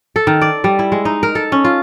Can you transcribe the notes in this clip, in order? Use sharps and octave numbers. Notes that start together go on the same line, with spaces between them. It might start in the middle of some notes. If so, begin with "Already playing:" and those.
A4
D#3
D5
G3
E4
G#3
D#4
A#4
A4
C#4
F4